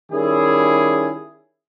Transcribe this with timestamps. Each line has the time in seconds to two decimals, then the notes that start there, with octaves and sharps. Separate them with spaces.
0.12 D#3 G3 C#4 E4 G#4